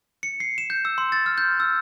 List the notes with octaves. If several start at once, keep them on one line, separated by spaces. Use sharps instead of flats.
C#7
C7
E7
G6
E6
C6
A6
F6
G6
E6